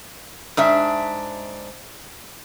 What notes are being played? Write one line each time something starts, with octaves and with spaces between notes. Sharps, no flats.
G#2 D4 E5